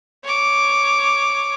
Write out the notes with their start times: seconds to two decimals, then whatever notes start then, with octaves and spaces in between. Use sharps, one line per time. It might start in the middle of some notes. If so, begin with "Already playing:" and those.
0.24 C#5 D6